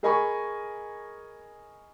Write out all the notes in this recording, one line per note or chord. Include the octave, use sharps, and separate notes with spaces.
G#4 A#4 D#5 G#5 B5 C#6